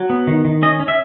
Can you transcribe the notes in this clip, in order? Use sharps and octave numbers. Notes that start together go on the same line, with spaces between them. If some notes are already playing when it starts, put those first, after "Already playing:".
Already playing: F#3
B3
D#3
D#3
C#4 D#5
C#4
E5